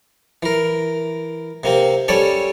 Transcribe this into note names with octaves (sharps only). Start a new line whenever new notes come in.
E3 A#4
C3 A#3 C4
G3 C#4 A4 C#5 D5